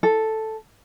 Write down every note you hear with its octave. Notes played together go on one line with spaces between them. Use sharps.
A4